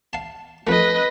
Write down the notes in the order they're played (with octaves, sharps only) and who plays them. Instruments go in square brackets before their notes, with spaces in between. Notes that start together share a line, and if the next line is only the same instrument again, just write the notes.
[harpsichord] F5 A5
[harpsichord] F2 A3 [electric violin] B4 D#5